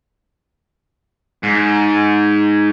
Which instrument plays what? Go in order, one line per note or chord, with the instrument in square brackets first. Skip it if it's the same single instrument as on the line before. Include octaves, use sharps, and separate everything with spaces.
[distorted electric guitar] G#2